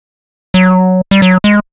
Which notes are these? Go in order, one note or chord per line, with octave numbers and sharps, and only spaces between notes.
F#3
G3
F#3
G#3